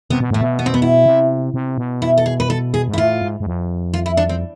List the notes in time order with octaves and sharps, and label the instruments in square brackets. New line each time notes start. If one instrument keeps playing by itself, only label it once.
[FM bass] C3 [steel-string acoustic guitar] B3
[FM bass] B2
[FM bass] A2 [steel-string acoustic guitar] A3
[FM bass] B2
[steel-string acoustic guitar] B3
C4
B3
E4
[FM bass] C3
C3
B2
[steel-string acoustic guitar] E4
A4
G#4
B4
A4
G#4
[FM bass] G#2
[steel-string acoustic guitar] E4
[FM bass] A2 [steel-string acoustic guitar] F4
[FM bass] G#2
G#2
F2
[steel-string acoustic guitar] F4
E4
D4
C4